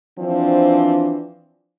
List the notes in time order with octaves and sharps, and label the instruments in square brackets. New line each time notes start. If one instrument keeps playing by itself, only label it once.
[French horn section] E3 F3 C4 D4